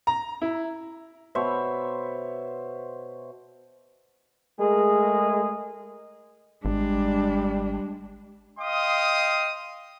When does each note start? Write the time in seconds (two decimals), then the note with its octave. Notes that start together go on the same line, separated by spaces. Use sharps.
0.07 A#5
0.42 E4
1.35 B2 C5 C#5 E5
4.59 G#3 A3 G#4 A#4
6.65 G#1 G3 G#3 D4
8.59 D#5 F5 G5 C6 D#6